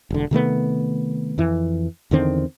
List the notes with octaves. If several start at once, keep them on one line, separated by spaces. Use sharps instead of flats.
E1 D3
C3 D#3 A3 B3
F2 E3
E2 D3 D#3 C4